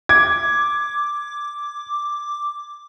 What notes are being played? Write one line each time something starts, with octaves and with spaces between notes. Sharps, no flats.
D6 G#6